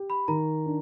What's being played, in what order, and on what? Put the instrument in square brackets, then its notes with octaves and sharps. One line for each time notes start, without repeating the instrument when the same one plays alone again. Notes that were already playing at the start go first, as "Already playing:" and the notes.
Already playing: [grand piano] G4
[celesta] B5
[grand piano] D#3 [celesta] A#5
[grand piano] D4